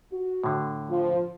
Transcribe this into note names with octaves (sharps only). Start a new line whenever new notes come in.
F#4
A2 D3
F3